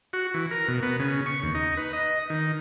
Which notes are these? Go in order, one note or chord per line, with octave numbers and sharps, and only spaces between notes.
F#4
E3
A#4
B2
B3
C#3
C#6
D#2
D#4
B4
D#5
D#3